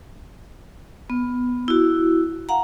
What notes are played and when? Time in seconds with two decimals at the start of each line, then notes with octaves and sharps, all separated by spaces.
1.10 B3
1.68 E4 F#4
2.49 F5 F#5 A#5